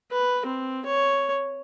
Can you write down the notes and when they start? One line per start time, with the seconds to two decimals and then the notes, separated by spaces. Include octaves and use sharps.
0.12 B4
0.46 C4
0.86 C#5